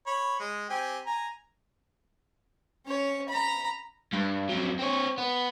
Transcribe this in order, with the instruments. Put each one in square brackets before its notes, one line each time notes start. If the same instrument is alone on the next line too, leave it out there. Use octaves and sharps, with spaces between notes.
[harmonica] C#5 B5
G#3
C4 G4 G#5
G#5 A#5
[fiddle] C#4 C#5
A#5 B5
[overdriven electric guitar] G2
F2 F#3
C4 C#5
B3